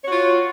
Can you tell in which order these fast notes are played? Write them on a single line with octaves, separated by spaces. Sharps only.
C#5 F#4 F4